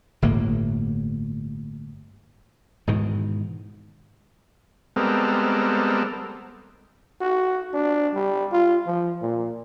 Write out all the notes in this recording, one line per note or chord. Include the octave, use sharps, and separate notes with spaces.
G1 A2 A#3
G#2 B2 D#3 E3
G3 G#3 B3 C4 A4 A#4
F#4
D4
G3
F4
F3
A#2